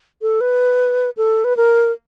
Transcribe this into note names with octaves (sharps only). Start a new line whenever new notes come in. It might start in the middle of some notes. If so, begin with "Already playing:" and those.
A4
B4
A4
B4
A#4